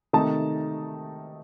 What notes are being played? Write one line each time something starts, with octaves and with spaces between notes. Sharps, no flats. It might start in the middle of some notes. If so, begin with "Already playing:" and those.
C3 D#3 A3 D#4 A5